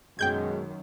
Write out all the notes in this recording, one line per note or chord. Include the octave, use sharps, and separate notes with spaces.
F#2 B2 D#3 G#3 G5 G6 G#6